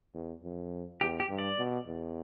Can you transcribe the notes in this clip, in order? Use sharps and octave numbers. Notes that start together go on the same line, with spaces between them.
E2
F2
E2 G4
G4
G2
D5
B2
E2